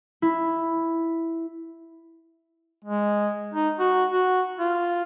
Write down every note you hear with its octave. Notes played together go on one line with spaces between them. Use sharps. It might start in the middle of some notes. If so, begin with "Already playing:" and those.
E4
G#3
D#4
F#4
F#4
F4